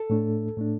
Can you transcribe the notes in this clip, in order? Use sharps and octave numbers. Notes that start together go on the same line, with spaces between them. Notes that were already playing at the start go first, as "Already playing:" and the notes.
Already playing: A4
A2 A3 D4
A2 A3 D4